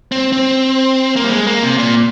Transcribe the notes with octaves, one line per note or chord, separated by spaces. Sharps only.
C4
C4
A#3
G3
G#3
A#3
C3
A#2